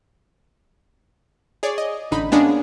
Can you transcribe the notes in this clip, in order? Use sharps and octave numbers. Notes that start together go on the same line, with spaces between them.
G#4 C#5 D5
D#5
A1 D3 D#4 B5
G#3 A#3 B3 C#4 D4 G#4